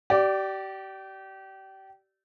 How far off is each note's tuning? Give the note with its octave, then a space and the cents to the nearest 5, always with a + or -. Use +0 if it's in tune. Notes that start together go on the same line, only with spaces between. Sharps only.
G4 -30 D5 +0